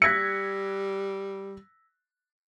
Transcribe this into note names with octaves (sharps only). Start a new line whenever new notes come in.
G3 E6 F#6 G#6 A#6 B6 C#7